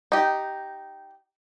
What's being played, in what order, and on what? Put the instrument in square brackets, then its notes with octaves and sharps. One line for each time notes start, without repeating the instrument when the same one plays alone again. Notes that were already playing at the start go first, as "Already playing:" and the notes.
[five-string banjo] D#4 G4